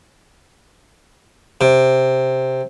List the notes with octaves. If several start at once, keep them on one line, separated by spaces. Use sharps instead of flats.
C3